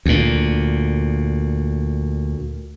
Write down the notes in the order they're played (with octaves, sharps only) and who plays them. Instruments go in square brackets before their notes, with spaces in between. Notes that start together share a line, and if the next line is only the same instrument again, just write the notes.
[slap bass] D2 A#2